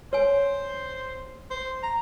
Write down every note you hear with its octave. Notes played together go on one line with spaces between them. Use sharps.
C5 C#5 G#5
C5
A#5